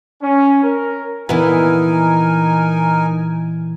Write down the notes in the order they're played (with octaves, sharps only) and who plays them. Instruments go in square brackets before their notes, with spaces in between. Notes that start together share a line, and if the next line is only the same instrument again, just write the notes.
[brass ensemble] C#4
A#4
[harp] A#2 E3 [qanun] B3 E4 [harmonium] D#4 A#4 G#5